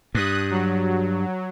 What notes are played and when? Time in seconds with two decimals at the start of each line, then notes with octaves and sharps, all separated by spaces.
0.15 G2 D#6 F#6
0.51 F#3